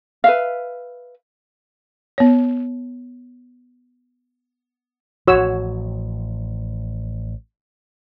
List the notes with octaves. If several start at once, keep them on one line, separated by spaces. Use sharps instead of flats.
B4 E5 F5
B3 C#5
A1 A2 F3 F#4 C#5 E6